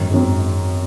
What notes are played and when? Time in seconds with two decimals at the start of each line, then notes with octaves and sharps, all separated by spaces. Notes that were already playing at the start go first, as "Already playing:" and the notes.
Already playing: G#1 F#2 D#3
0.11 G#1 F#2 D#3